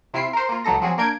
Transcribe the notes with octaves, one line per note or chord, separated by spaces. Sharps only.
C3 E4 F4 E5 C7 D7
A#4 C5
A#3 F4
C#2 F#3 D#4 A4 A#6
F3 F#3 C4 F#4 G#4
A#3 D4 A#4 G6 G#6 D7